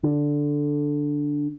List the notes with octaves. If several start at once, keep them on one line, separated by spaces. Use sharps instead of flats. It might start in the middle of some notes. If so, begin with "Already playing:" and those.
D3